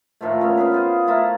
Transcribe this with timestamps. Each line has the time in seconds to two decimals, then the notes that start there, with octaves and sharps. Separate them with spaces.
0.21 A2 D#3 F3 A3
0.40 A#2 C#3 B3
0.57 C#4 G#4 B4
0.72 F4 G#4 C5
1.07 A3 E4 F4 A#4